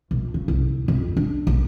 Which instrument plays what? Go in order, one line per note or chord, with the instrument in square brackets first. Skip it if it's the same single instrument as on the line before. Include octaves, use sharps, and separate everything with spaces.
[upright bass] A#1
C#3
C2
F2
D4
A#1